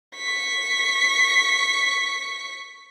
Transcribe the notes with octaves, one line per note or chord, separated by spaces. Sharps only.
C#6 B6